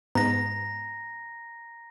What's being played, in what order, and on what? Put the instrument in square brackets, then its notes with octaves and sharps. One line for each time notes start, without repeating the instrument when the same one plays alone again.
[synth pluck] G#2 B3 [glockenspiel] A#5 A#6